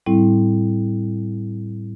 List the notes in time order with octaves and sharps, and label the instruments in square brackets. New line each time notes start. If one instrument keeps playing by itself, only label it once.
[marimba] A2 G3 C4 E4